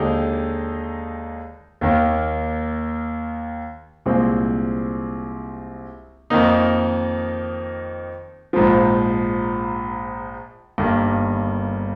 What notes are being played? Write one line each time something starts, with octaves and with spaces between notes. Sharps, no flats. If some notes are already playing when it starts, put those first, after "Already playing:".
Already playing: D#2 D3 G#3 D#4 G4
D#2 D#3 A#3
C2 A#2 G#3 C4
F2 D#3 A#3 D#4
A#1 G#2 F3
G1 G2 D#3 G3 A#3